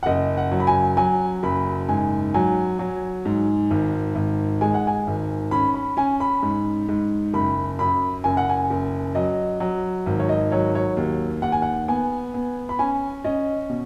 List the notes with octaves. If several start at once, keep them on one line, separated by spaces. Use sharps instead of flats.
F#5
F#1 D#5
F#5
F#3
B5
G#5
F#3 G#5
F#1 B5
G#2 G#5
F#3 G#5
F#3
G#2
G#1
G#1
G#3 G#5
F#5
G#5
G#1
C#4 B5
B5
C#4 G#5
B5
G#2
G#2
F#1 B5
F#2 B5
F#1 G#5
F#5
G#5
F#1
F#3 D#5
F#3
G#1
C#5
D#5
F#3 C#5
C#5
D#2
D#2 F#5
G#5
F#5
B3 G#5
B3
B5
C#4 G#5
C#4 D#5
B2